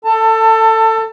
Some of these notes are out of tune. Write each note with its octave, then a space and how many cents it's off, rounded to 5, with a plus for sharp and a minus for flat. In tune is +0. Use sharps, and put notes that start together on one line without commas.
A4 +20 A5 +30